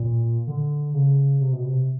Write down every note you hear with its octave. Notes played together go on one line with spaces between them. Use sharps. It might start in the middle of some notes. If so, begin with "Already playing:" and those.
Already playing: A#2
D3
C#3
C3
B2
C3